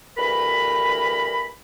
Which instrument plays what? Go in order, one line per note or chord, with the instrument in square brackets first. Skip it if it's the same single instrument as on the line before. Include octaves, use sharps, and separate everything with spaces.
[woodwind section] D2 G2 E3 A#4 B5